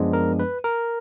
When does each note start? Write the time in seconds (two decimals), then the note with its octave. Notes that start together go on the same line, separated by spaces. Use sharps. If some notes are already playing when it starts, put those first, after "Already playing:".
Already playing: F#2 F3 G#3 B3 D4
0.13 A#4
0.39 B4
0.64 A#4